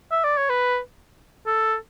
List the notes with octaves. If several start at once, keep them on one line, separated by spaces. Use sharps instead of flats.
E5
D5
C#5
B4
A4